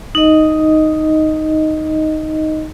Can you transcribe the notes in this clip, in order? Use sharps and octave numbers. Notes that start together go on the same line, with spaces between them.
D#4 D#5